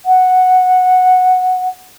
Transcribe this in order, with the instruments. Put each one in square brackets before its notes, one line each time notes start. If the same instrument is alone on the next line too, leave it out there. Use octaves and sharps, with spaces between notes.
[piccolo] F#5